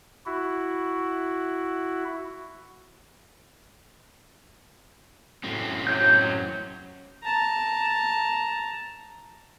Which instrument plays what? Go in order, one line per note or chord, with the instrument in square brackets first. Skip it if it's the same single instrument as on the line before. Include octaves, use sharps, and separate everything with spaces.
[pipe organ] E4 F#4
[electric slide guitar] F#2 A2 C4
[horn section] C3 F#3 [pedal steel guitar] G6
[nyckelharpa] A5 A#5